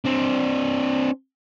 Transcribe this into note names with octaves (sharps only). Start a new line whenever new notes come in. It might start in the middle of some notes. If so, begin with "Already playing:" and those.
C4 D4